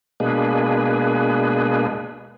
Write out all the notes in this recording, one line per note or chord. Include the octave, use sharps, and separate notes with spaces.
B2 G#3 A#3 D4 G#4 B4